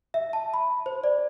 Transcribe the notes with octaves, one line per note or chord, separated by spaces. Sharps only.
E5
A5
B5
C5
D5